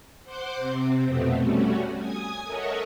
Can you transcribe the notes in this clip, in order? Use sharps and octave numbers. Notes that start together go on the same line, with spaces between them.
C5 F#5 C6 D6 G6
C3 C4
F2 B2 A3 B3 C4
G3 A3 C#4 F#4
G#5 D#6 G#6
A4 A#4 C#5 D#5 E5 F#5